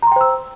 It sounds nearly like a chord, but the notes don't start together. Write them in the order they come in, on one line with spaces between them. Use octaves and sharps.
A#5 C6 G5 C5 E6